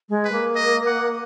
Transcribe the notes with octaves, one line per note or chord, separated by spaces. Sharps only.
G#3
B4
A#3
D#5
F#5